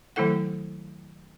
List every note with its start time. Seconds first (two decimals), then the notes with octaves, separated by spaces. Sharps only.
0.16 D#3 F#3 A3 E4 A4 F#5